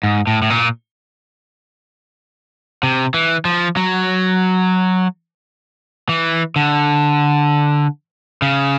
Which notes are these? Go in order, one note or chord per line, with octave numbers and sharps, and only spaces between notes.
G#2
A2
A2
A#2
C3
E3
F3
F#3
E3
D3
C#3